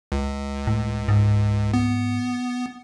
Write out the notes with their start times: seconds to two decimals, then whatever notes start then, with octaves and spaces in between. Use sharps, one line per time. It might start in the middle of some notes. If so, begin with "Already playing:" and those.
0.12 C#2
0.67 A2
1.08 G#2
1.74 B3